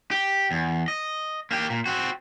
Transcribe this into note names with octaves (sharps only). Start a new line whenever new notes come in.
G4
E2
D#5
A#3 G4
A#2
C4 F#4